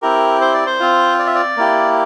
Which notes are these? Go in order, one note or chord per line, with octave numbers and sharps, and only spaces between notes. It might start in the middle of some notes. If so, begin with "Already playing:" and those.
C4 E4 G4 A#4
C5
D5
C5
C4 F4
D5
E5
D5
A#3 E4 G4